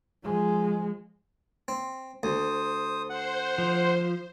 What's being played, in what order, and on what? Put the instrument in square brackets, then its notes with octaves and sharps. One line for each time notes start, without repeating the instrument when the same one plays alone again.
[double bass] F3 G#3
[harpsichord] C4
[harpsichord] D2 [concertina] C5 D#6
[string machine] C5 [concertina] F#5
[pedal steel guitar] F3